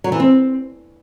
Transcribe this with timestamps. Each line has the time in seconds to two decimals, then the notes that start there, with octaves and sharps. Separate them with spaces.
0.04 F#3
0.12 E3
0.20 C4